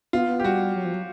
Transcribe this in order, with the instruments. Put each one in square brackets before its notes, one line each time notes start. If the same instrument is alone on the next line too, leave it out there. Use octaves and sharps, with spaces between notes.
[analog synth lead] B3 [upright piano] F4
[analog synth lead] B3
[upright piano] G4
[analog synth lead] G3 [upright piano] F#4
[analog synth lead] F#3
F3
F#3